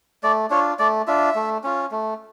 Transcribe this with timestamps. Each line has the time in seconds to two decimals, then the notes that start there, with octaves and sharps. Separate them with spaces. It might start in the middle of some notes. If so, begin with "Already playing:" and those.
0.23 A3 D5
0.50 D4 F4 C#5
0.79 A3 D5
1.07 D4 F4 E5
1.35 A3
1.64 C#4 F4
1.91 A3